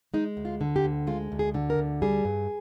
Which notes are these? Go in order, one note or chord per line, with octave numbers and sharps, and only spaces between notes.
G#3 D#4
D2
F4
D3
G4
D2
G#3 F4
D2
G#4
D3
A#4
D2
G3 G#4
G2